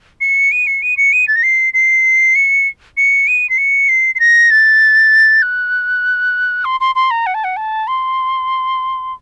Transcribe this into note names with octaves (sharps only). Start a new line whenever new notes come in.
C#7
D#7
C#7
D#7
C#7
D#7
A6
A#6
C7
C7
C#7
C#7
D#7
C7
C#7
C7
C7
A#6
A6
F#6
C6
C6
C6
A#5
F#5
A5
F#5
A5
C6